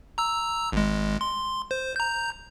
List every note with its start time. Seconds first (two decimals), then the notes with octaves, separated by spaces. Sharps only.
0.18 A#5 E6
0.72 G#1 G#3
1.21 C6
1.71 C5
1.96 A#5 G6